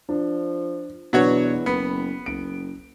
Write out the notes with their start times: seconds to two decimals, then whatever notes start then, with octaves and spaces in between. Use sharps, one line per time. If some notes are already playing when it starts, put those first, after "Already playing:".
0.09 F3 D4
1.13 E2 B2 F#3 D4 F#4 B4 C#5
1.66 F#1 B3 B5
2.26 F#1 D7